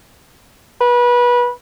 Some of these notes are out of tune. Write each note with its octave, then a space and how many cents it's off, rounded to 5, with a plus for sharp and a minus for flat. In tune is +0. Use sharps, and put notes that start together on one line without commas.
B4 -25